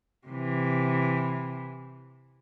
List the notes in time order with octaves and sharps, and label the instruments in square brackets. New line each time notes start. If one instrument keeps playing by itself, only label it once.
[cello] C3 E3